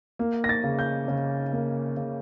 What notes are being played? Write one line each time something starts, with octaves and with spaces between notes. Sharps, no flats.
A#3
A#6
A6
C#3
G6
C#3
A#3
C#3